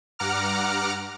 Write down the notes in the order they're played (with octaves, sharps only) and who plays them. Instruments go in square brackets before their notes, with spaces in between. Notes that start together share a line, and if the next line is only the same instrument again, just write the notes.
[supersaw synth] G2 F#5 A#5 D6 F6